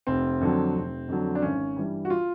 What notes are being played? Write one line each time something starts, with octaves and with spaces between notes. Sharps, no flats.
F1 C4
F2 D3 F#3
F1
F2 D3 F#3
D4
G#1 C#4
G2 E3 G3
F#4
F4